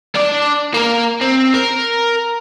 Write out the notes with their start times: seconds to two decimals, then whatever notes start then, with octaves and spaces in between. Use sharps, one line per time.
0.16 D4 D5
0.74 A#3 A#4
1.21 C4
1.54 A#4